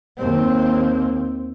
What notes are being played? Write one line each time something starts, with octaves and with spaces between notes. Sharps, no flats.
D#2 C4